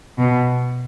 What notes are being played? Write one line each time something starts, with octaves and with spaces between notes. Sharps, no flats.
B2